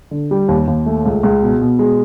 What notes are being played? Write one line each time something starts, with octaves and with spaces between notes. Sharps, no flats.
D3
G3
D#2
D#2
A3
C#2
C#2
B2
B2
G#3